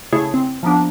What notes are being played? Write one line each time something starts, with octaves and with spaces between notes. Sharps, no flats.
C#3 A3 E4 G#4 C#5
C4
F3 A#3 B3 D4